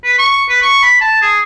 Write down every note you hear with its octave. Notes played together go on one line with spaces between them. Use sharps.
B4
C#6
B4
C#6
B5
A5
G#4